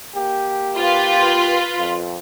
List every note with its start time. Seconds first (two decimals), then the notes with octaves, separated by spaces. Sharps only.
0.14 A#3 G4
0.76 F4 B4
1.78 F2